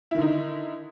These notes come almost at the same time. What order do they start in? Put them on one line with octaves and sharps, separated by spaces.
E4 D#3 D3 D#4